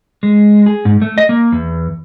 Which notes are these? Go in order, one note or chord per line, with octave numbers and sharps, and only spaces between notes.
G#3
G#4
G#2
A3
D#5
A#3
E2